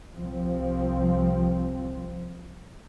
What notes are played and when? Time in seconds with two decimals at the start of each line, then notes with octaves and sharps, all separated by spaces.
0.15 C2 F3 C4